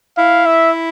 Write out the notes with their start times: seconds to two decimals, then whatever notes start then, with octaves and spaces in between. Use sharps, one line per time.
0.18 E4 F5
0.46 E5